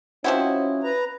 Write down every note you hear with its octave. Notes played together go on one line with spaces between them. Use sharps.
F3 C4 C#4 E4 F#4 C5 D#5
B4 A#5